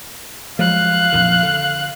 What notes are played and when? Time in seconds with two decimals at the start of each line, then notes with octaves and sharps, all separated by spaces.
0.59 F3 F#3 G#3 F5 F#6
1.12 A#1 F2 D#3
1.43 D3